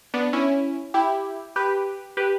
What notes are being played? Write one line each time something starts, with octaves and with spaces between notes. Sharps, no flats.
B3 D4
C#4 E4
E4 G4
G4 B4
G4 B4